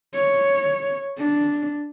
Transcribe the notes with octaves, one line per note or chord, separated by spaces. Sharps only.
C#5
D4